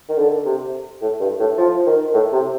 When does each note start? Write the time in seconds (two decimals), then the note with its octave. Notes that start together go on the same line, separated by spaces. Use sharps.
0.09 D#3
0.18 D3
0.45 C3
1.01 A2
1.20 G2
1.39 A2
1.57 F3
1.86 D#3
2.13 A2
2.32 C3